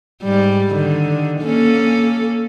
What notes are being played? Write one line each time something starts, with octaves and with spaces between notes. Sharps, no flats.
G#2 G3
D3 D#3
A#3 C#4 A4